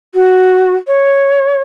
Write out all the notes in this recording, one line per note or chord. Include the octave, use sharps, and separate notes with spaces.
F#4
C#5